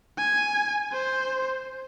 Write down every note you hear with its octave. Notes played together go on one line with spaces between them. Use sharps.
G#5
C5